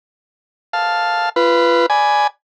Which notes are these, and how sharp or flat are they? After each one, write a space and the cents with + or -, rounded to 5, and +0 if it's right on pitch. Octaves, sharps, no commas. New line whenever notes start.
F5 +0 A5 +0
F4 -30 B4 +0
D5 +0 G#5 +5 B5 +0